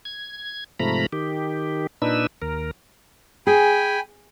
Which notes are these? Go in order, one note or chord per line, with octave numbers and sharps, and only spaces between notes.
G#6
G#2 C3 F3 A3 A#5 B5
D#3 G4
A#2 D4 D#4 B4 E6
D#2 A#4
G#4 G5 G#5 B5